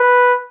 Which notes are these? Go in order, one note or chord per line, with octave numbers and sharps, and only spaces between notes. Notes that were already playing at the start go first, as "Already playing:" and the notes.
Already playing: B4